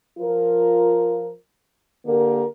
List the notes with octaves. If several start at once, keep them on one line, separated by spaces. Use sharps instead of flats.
F3 F4 A#4
D3 A#3 G4 A#4